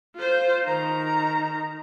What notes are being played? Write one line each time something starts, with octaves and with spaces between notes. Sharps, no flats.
F4 C5
D#3 A#5